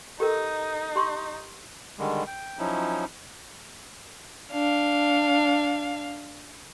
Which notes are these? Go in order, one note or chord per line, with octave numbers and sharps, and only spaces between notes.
D#4 G4 A4 A#4
G4 C6 C#6
D3 D#3 G3 G#3
G5
F3 F#3 C#4 D#4 E4
D4 F5